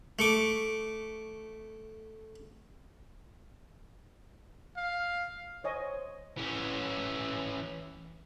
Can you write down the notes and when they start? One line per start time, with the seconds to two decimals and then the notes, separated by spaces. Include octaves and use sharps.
0.19 A3 C#6 D6
4.77 F5
5.64 C5 C#5 D#5 G#5
6.38 E3 C#4